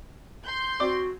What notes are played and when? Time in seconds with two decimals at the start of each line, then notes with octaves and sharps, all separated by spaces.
0.46 C6 G6
0.80 C4 F#4 D5